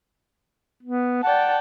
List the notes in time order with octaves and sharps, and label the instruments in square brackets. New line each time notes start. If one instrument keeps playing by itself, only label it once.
[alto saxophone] B3
[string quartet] D5 G5 A5 [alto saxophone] F#5